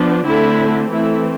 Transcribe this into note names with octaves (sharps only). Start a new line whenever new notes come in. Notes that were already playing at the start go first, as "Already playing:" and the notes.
Already playing: F3 B3 D4
D3 A3 C4 E4
E3 A3 C4 E4